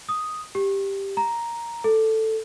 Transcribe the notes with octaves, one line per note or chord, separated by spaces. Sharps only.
D#6
G4
A#5
A4